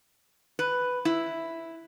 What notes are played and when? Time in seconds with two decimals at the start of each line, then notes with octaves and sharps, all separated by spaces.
0.59 B4
1.05 E4